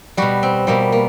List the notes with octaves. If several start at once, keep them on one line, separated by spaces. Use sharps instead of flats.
B2 G3 F#4
C4
B2 G3 A#3
A#3